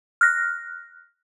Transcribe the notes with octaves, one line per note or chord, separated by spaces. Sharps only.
F6 F#6 A#6